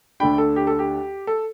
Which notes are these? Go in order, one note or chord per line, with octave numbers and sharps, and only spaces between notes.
D2 D3 A3 D4 G5 B5
A4
G4
A4
G4
A4